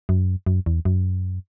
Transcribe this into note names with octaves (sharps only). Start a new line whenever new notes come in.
F#2
F#2
E2
F#2